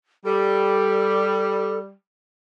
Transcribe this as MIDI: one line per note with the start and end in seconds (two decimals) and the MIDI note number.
0.25 1.91 55
0.25 1.79 69